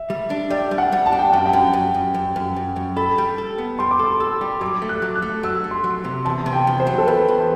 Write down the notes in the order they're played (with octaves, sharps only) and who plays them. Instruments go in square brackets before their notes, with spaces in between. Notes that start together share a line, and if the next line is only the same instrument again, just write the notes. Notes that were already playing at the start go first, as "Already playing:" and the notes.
Already playing: [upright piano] E5
[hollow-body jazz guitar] G3
D4
[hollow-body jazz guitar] G3 [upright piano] D5
[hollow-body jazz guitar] G3
[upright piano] F#5
[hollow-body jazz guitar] G3
[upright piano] A5
[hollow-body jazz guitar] D4
[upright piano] G5
[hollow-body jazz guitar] F#2 [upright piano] F#5
[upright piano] G5
[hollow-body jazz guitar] F#2
F#2
F#2
F#2
F#2
F#2
F#2
[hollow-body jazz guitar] A4 [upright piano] B5
[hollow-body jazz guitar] G3
A4
B3
[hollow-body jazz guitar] G3 [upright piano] C6
[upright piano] D6
[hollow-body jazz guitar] A4 [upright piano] C6
[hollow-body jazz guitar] A4 [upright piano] E6
[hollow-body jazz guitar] G3
[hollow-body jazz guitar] F#3 [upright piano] D6
[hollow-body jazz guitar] A3
[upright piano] F#6
[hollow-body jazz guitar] F#3
[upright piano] F#6
[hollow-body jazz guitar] A3
[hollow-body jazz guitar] F#3 [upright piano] E6
[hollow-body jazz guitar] A3
[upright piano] C6
[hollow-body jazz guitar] F#3
C3
[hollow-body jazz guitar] E2 [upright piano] A5
[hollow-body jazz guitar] C3
[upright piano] G5
[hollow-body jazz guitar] E2
[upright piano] C5
[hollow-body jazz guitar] F#3
[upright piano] A4
[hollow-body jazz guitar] E2 [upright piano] B4
[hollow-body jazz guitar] E2